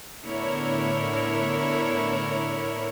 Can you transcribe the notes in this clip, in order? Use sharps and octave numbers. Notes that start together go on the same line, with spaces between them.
A2 D3 B3 E4 A#4 C#5